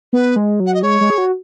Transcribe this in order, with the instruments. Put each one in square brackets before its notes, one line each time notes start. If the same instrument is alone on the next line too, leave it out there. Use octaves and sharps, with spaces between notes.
[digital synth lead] B3 [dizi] B4
[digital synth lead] G#3
F#3
[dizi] F#5
D#5
[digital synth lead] G#3 [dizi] C#5
[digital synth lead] G#3
G#4
F#4